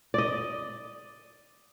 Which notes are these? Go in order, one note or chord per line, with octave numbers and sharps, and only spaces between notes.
D5 D#5